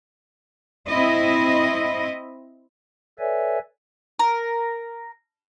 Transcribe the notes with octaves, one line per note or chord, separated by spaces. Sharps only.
C4 E4 D#5
A4 B4 C#5 D5 E5 G#5
A#4